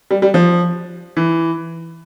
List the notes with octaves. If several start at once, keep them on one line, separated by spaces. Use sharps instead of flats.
G3
G3
F3
E3